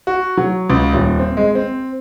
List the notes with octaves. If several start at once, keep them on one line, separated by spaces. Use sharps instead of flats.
F#4
F#3
C#2
D#1
C4
G#3
C4